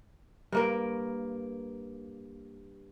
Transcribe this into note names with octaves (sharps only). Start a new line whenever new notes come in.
G2 A#3 A#4